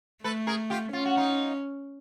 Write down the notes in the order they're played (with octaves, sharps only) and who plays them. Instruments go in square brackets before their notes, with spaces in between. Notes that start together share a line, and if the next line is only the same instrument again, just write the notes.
[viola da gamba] A3 [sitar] A4 B4
[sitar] G#4 A#4
F4 G4
[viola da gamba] C#4 [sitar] F4
[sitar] F#4
D#4 F4